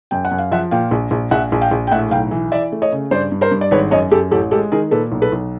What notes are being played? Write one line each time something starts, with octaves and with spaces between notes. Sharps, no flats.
F#2 G5
F#5
F#2
F5
F3 E5 F#5
A#2 F5 G5
A#1
A#1
A#1 E5 F#5
A#1
F5 G5
A#1
G5
A2 E5 F#5
B1 F5 G5
E3
E3 D5 E5
A3
C#5 D#5
C#3
G2 C5 D5
G2
A#4 C5
G2
D5
G#1 B4 C#5
F#2 C#5 D#5
F#2 G4 A4
A1 G4 A4
G#3 G4 A4
D#3 G#4 A#4
A#2 A4 B4
B1
A4 B4
B1